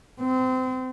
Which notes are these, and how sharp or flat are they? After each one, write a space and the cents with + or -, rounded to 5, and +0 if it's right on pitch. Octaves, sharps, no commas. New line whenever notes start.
C4 -25